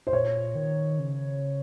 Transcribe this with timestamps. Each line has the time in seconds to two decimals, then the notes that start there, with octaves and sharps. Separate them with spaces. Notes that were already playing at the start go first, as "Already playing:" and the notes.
0.07 C5
0.13 A#2 C#5
0.55 D#3
0.99 C#3